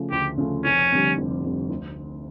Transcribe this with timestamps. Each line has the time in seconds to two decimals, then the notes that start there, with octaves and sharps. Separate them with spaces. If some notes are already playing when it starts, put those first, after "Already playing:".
Already playing: C#3 F3 A3
0.11 D2 G4
0.38 C#3 F3 A3
0.64 F1 C#4
0.91 F2 D3 G3
1.17 F1
1.43 F2 D3 G3
1.70 D2